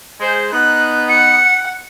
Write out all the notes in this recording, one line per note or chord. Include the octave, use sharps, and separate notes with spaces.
G#3 C5
B3 D#4 F#6
F#5 C#7